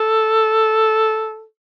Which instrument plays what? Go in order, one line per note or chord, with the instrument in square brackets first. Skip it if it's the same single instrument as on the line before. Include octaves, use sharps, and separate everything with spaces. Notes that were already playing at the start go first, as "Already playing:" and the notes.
Already playing: [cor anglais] A4